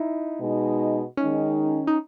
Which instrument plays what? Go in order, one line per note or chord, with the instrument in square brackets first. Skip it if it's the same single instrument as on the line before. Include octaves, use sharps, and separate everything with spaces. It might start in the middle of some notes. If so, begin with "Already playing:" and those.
Already playing: [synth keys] D#4 E4
[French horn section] B2 G#3 D#4
[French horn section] D#3 G#3 D#4 [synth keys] C#4
[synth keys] D#4